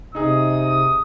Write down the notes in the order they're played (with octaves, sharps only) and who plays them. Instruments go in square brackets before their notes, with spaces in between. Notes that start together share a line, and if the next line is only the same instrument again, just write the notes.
[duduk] C3 [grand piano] D#4 G#4 [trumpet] D#6